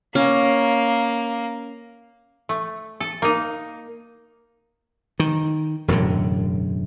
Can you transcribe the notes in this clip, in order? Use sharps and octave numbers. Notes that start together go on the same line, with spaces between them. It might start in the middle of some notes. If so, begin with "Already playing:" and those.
A#3 C#4
A3
A4
A#3 D#4
D#3
E1 F#2 A2 D3